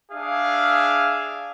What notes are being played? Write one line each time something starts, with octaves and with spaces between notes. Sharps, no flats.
D4 G#4 E5 F5